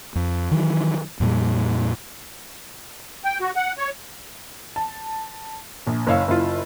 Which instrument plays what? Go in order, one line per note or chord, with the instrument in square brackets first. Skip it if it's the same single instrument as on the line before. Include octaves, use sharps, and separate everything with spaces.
[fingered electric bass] F2
D#3 E3 F#3
F2 A#2 G3
[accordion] G5
F#4
F#5
C#5
[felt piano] A5
A#1
F#1 C#5 F5 E6
F#1 E4 F4